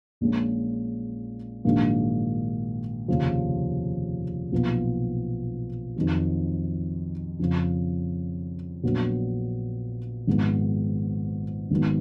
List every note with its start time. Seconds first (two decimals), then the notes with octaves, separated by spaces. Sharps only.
0.21 A#1 A#2 G#3 C#4
1.65 A#1 G#2 D#3 F#3 A#3
3.08 F1 D#2 C#3 F3
4.52 B1 A#2 F3 B3 F4
5.96 F2 D#3 F#3
7.39 F2 C#3 F3
8.83 A#1 A#2 F#3 B3
10.27 G#1 G#2 F3 B3
11.71 G#1 G#2 D#3 F#3 B3